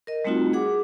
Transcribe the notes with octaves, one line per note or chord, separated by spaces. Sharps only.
A#4 D#5
G3 A3 C4 D#4 F4 F#4
G#4 F#5 D6